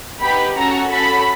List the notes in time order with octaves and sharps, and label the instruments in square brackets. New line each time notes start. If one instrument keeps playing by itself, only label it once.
[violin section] B3 D#4 G4 B5
C#4 F#4 A4 A#5
C#4 F#4 A4 B5